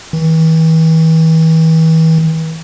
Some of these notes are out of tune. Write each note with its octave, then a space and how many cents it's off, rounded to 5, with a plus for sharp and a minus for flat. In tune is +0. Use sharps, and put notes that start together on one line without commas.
E3 -40